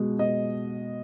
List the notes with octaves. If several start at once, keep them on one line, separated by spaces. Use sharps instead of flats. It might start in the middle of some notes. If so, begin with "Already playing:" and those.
Already playing: B2 G#3
B2 D#5